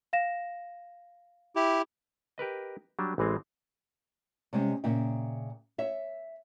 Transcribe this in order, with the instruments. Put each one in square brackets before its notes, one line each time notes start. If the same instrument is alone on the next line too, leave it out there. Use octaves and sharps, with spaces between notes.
[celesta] F5 A#6 E7
[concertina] E4 G4
[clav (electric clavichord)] G4 A#4 B4 D#5
F#3 G3 D4
A1 E3 G#3 C4
[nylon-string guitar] C3 G3 G#3 C#4
A#2 C#3 E5 G5
C#5 E5